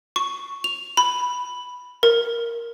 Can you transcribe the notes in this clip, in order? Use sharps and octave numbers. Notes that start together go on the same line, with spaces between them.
C#6
F7
B5
A#4